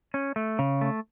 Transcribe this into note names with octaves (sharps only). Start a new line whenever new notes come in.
C#4
A3
C#3
A3